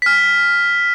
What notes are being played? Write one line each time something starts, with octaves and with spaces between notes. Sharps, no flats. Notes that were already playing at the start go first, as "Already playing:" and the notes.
F6 B6